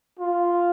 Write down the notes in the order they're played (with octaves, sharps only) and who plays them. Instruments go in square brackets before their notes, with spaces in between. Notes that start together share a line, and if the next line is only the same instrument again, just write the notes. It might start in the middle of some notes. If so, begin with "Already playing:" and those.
[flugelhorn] F4